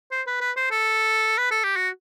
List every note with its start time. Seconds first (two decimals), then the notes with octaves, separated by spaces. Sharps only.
0.12 C5
0.27 B4
0.41 B4
0.57 C5
0.71 A4
1.38 B4
1.51 A4
1.64 G4
1.76 F#4